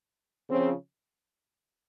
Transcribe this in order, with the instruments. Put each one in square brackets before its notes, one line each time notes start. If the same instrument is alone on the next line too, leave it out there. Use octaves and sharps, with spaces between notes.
[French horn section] C#3 F3 C4